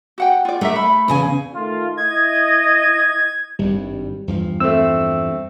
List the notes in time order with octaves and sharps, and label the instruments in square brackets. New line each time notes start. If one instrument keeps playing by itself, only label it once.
[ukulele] F#4 F#5 G5
F4 D5
[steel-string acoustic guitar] A3 [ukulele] D4 A#4 E5
[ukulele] B5
[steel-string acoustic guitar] E2 C#3 G#5
[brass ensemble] D#3 A3 F4
[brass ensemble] E4 D#5 [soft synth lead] G#6
[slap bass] G#1 G2 [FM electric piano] G3
[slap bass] E2 G2 F3
[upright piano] A3 C4 [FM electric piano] E6